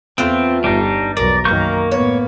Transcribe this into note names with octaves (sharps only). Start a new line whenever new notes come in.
E2 A3 B3 C4 F4
G1 G3 D4 D#4
B1 E2 A#4 D5
F#2 D#3 A#3 C#6 G6
A2 B3 C#5